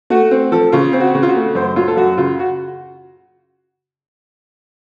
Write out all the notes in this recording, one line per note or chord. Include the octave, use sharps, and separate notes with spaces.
A3 F#4
C4
F3 A4
C#3 F4
C4
F#4
C#3
F4
F#4
A3
F#2 C5
F#3 F4
A4
F#2 F#4
C#3 F4
F#4